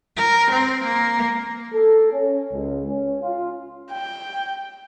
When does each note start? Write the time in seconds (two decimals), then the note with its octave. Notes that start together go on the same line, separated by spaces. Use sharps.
0.16 A#4
0.50 C4
0.83 A#3
1.73 A4
2.11 C#4
2.52 C#2
2.87 C#4
3.21 F4
3.92 G5